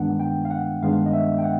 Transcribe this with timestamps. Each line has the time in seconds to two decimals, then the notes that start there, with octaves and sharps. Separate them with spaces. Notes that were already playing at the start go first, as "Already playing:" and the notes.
Already playing: G2 D#3 G#3 B3 D4 F#5
0.20 G5
0.45 F5
0.51 F#5
0.83 G2 D#3 G#3 B3 D4 F5
1.06 D#5
1.13 E5
1.39 G5
1.44 F#5